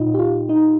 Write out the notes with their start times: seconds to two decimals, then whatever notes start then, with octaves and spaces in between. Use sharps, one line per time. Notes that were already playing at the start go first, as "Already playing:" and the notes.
Already playing: A#2 D#4 F4
0.14 G4
0.19 F4
0.49 D#4